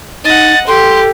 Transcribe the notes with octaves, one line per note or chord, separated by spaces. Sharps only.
D#4 D#5 F#5 A6
G4 A4 C6